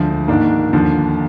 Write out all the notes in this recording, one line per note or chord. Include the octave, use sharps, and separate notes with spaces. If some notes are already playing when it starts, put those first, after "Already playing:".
Already playing: D2 D3 F3 G#3
G#2 D#3 A#3 D4
D#2 D3 F3